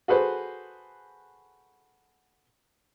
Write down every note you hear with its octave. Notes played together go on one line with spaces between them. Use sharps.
F#4 G#4 A4 B4 C5